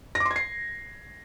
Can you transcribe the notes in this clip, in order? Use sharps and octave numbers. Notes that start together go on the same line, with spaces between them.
A#6
D6
C6
G#6
C7